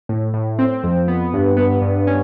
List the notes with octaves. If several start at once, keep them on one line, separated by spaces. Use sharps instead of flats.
A2
A2
C4
F2
B3
G2
B3
G2
C#4